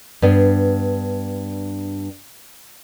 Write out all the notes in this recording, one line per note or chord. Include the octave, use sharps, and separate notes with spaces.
G2 B3 D4